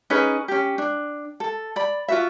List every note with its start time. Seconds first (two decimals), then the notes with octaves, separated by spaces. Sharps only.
0.10 C#4 D#4 G#4 B4
0.48 C#4 G4
0.78 D4
1.40 A4
1.76 D5 B5
2.08 F4 F#4 E5